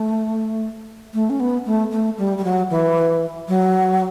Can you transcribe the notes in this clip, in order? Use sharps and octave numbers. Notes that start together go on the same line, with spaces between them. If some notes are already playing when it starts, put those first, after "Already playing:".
Already playing: A3
A3
C#4
B3
A3
A3
G3
G3
F#3
E3
F#3